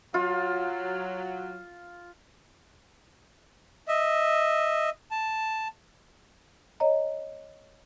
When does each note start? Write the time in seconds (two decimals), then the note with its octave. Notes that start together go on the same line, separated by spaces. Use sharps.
0.14 F#3 F4
3.88 D#5 E5
5.11 A5
6.80 C#5 D#5 A#5